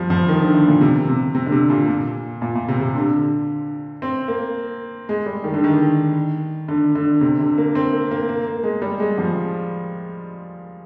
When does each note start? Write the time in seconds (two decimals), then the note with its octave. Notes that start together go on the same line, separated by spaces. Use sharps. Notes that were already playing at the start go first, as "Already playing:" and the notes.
Already playing: F3 G3
0.10 F3
0.28 D#3
0.41 D3
0.54 D3
0.68 A#2
0.81 C3
1.09 C3
1.35 C3
1.46 D3
1.52 C3
1.70 A#2
1.88 A#2
2.42 A#2
2.55 A#2
2.68 C3
2.81 C3
2.95 D3
4.02 C4
4.28 A#3
5.09 G#3
5.26 G3
5.44 D#3
5.54 D3
5.64 D#3
6.68 D3
6.95 D3
7.21 C3
7.40 D3
7.58 A#3
7.75 C4
7.93 A#3
8.11 A#3
8.29 A#3
8.47 A#3
8.63 G#3
8.82 G3
9.00 G#3
9.18 F3